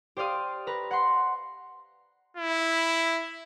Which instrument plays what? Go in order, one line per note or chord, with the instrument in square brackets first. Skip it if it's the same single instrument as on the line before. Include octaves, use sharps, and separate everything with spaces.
[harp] G4 C5 D5 F5 D#6
B4 A#5
F#5 C6
[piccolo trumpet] E4